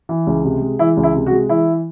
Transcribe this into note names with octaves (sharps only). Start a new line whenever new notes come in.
E3
C#2
C3
G#3
E3 E4
C#2
E4
C3
F#4
G#3
E3 E4